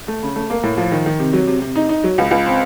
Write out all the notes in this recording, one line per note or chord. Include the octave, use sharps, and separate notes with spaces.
A3
C#3
A3
A#3
A2
F3
D#3
D#3
C3
F#3
C3
C3
D#4
D#4
F#3
C#2
C#2
C4